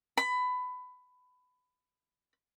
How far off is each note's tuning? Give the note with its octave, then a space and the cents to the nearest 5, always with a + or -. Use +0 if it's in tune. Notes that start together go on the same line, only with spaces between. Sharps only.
B5 +20